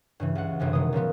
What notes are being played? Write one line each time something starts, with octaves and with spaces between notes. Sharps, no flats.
G2 C#3 E3
C#2 F#5
G1 F#2 C3
F1 D#3 G#3 D#6
A#2 C#3 F3 B3